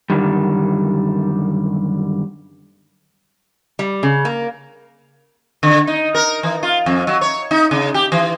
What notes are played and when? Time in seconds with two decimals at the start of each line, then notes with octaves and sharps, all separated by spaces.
0.10 F#2 D3 D#3 G3
3.79 G3
4.03 C#3
4.25 A#3
5.63 D3
5.87 D#4
6.15 A#4
6.43 E3
6.63 F4
6.86 F2
7.07 F#3
7.21 C#5
7.51 D#4
7.71 C#3
7.94 G4
8.12 E3